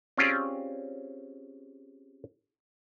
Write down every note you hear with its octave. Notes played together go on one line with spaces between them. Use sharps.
C4 C#4 F4 G4 G#4 D5